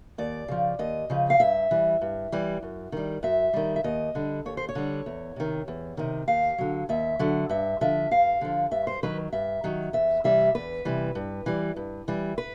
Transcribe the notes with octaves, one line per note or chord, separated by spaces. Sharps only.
D#2 D5
C#3 F3
D#2 D#5
C#3 F3
F5
G2 E5
E3 G3
G2
E3 G3
F#2
D#3 G3
F#2 E5
D#3 G3
E5
D#2 D#5
D3 G3
D#2 C#5
C5
C#5
D3 G3
E2
C3 D#3
E2
C3 D#3
D#2 F5
D3 F#3
D#2 E5
D3 F#3
G2 E5
D3 F3 E5
G2 F5
D3 F3
G2 E5
C5
D#3 F#3 B4
G2 E5
D#3 F#3
E2 E5
C3 E3 G3 E5
E2 B4
C3 E3 G3
G2
E3 G3
G2
E3 G3
B4